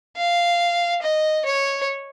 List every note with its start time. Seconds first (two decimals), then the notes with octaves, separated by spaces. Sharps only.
0.17 F5
1.02 D#5
1.45 C#5